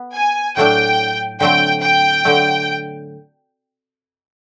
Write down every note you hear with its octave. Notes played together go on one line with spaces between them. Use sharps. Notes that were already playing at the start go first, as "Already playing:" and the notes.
Already playing: B3
G#5
A2 F#3 A3 D4 G5
D3 F#3 A3 C4 G5
G5
D3 F#3 A3